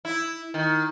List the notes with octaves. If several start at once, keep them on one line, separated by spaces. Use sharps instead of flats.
E4
D#3